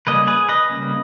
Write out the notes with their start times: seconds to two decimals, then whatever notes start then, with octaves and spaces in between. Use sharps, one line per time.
0.07 C#3 G3 A#3 C#4 B4 D#5
0.27 G#4 B4
0.49 B4 D#5
0.70 C#3 G3 A#3 C#4